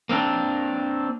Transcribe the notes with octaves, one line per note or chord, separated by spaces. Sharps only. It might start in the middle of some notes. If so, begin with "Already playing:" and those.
A#3 C4 D4